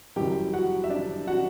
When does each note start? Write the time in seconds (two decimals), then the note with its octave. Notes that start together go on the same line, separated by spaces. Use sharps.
0.16 F#1 F#2 E3 G3 G4 G5
0.53 F#4 F#5
0.84 E5
0.90 D4 D5
1.27 F#4 F#5